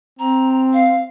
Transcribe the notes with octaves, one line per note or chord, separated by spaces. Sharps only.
C4 A#5
F5